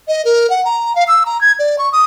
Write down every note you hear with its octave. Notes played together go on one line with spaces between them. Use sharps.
D#5
A#4
F#5
A#5
F5
E6
A#5
G#6
D5
C#6
D#6